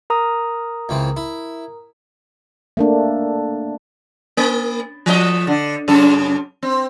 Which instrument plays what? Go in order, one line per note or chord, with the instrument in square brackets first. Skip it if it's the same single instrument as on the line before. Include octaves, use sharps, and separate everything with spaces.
[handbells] A#4 A#5 D#6
[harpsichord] C#2 E3 C4
E4
[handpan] A3 A#3 D4
[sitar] A#3
F3 A3 D#5
D3
F#2 C#3 A4
C4